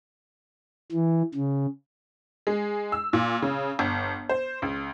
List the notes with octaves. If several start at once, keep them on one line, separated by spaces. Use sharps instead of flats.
E3
C#3
G#3
E6
A#2
C#3
G1
C5
C#2